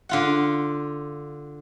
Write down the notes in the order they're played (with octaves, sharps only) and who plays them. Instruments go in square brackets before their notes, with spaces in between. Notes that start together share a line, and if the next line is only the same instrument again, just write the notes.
[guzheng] D3 F4 F#5